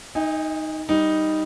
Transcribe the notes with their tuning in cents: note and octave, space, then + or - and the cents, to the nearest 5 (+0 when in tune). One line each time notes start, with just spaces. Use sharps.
D#4 +0 D#5 +45 G#5 -40
G3 +0 D#4 +0